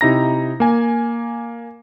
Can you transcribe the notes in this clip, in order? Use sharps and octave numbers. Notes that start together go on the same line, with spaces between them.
C3 D#4 E4 A#5 A#6
A#3 G#5